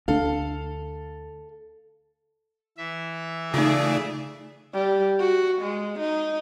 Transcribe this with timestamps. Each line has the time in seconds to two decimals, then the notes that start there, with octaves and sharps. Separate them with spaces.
0.08 D2 D4 A4 F5
2.78 E3 E5
3.54 C#3 A3 D#4 F4 G#4 D5
4.74 G3
5.20 F#4
5.62 G#3
6.00 D#4